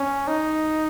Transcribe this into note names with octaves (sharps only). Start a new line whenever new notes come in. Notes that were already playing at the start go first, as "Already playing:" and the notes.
Already playing: C#4
D#4